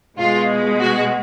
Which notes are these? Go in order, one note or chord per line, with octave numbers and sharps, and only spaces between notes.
B2 G#3 F4
F#4